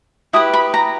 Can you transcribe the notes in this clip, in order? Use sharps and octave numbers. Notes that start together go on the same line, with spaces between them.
E4 G4 B4 D#6
B5
A#5